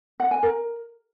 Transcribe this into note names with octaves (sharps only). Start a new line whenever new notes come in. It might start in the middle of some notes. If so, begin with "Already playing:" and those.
F#5
G#5
A#4